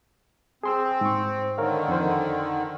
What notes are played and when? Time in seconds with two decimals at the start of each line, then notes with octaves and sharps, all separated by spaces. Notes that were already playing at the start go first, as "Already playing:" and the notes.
0.63 C4 G#4 C6 E6
1.01 G#2 C#6
1.58 D3 D#3 A#4 C#5 F5
1.88 F2 D#4 C5